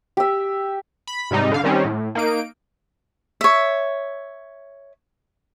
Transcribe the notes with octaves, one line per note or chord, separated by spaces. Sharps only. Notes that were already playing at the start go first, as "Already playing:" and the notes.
G4 E5
B5
G#2 C3 G3 D#4
D3 F5
D#3 G3 C4 C#4
A2
A#3 D#4 D7
C#5 E5